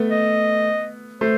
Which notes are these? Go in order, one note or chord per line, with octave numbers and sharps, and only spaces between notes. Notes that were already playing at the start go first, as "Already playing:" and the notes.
Already playing: A3 B3
D#5
A3 C5